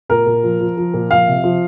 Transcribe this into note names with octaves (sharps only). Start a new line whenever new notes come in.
A#2 A#4
A#2
F3
F3
F3
A#2
F3 F5
C3
F3